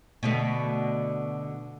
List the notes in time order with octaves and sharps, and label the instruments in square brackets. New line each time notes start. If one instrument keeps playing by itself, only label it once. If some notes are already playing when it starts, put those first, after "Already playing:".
[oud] B2 D3 A3